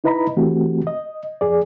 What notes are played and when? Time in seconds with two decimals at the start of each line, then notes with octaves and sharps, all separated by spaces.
0.04 D#4 E4 B4 D#5 A#5 B5
0.37 E3 A3 C4 F#4 G4
0.87 D#5
1.41 F2 G#4 D5